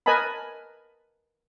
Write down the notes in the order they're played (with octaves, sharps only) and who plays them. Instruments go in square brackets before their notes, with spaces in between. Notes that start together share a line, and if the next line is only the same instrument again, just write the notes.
[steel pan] A#4 B4 D#5 G#5 A5 B5